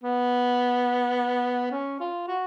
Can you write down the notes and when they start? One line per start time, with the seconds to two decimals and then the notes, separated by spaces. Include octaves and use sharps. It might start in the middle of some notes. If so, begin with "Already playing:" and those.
0.03 B3
1.71 C#4
2.00 F4
2.27 F#4